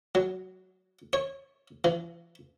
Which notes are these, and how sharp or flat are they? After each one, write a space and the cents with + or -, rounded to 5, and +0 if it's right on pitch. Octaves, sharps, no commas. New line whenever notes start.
F#3 +5
C#5 -25
E3 +45